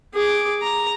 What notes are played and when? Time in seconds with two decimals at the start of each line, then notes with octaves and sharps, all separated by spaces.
0.14 G#4 D6
0.62 A#5